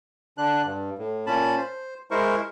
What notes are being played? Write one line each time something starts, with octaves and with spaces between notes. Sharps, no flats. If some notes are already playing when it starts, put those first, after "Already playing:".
D3 D4 F#6
G2
A2
A#2 C#4 A5 B5
C5
G#3 E4 A#4 C5 C#6